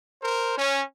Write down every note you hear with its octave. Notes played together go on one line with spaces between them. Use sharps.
A#4 C5
C#4